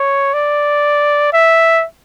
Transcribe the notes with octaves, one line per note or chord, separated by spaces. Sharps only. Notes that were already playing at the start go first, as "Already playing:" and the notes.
Already playing: C#5
D5
E5